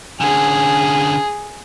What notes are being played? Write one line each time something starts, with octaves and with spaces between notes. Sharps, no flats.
D3 C#4 G#4